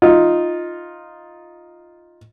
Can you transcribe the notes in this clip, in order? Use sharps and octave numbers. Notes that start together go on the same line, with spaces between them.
D#4 F4